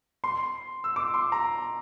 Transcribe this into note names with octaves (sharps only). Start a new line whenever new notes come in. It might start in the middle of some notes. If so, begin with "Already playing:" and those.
C6
E6
D6
C6
A#5